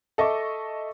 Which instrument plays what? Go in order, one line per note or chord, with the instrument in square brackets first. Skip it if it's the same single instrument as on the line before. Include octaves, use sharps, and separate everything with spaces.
[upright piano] A4 D#5 E5 C#6 D6